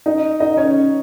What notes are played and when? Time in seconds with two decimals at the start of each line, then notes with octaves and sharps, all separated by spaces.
0.06 D#4 D#5
0.40 D#4 D#5
0.57 C#4 C#5